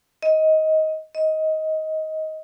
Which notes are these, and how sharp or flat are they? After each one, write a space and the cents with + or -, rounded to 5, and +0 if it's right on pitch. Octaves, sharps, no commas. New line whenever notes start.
D#5 +15
D#5 +15